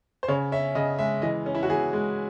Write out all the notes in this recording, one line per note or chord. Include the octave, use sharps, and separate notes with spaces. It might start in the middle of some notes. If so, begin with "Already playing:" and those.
C5
C#3 C#5
C#4 E5
C#3 D#5
G#3 E5
E3 D#5
C#4
E4
F#4
E3 G#4
G#3